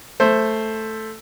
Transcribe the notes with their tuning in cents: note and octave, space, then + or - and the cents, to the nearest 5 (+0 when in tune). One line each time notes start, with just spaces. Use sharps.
A3 +0 C5 +5